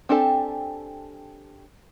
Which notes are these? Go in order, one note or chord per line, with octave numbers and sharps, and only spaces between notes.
C4 D4 G4 A4 G#5